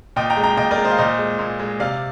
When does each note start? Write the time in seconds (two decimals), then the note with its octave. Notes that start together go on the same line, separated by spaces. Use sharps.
0.16 A#2 D#5 G5
0.30 G5 A#5
0.37 G#3
0.43 G5 A#5
0.57 A#2 D#5 G5
0.71 A#4 D5
0.77 G#3
0.84 C5 D#5
0.91 F5
0.98 A#2 C5 D#5
1.18 G#3
1.39 A#2
1.60 G#3
1.79 C3 D5 F5